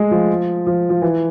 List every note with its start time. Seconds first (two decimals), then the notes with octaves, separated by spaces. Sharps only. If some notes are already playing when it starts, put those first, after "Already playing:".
Already playing: G#3 A3
0.11 F3
0.67 F3
0.90 F3
1.02 E3